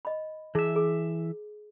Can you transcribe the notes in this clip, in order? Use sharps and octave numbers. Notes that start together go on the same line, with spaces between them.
D#5 B5
E3 G#4 E5 A5
G#4